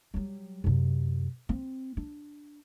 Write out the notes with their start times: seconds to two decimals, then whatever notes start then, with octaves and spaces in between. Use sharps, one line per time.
0.14 F#3 G3
0.64 F#2 C3
1.49 C4
1.97 D4